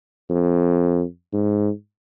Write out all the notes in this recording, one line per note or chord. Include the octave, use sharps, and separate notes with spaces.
F2
G#2